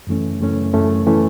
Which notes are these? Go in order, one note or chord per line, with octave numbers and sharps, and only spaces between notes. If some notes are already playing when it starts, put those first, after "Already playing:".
F#2 E3 A3 C#4
F#2 E3 A3 C#4
F#2 E3 A3 C#4
E3 A3 C#4